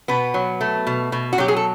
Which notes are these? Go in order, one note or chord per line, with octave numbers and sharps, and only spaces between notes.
B2 B3 B4
F#3
A3
B2
B2
F#4
F#3 G4
G#4
A4